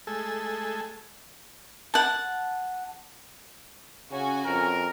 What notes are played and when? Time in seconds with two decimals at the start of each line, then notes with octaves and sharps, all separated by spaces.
0.07 G#3 A3 A4 G#5 E6
1.94 F#5 A5
4.11 C#3 C#4 F#4 G#5
4.45 F2 A#4